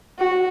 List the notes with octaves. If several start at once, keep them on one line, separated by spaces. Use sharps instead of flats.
F#4